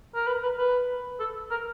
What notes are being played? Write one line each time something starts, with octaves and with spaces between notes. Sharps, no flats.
A#4
B4
B4
B4
A4
A#4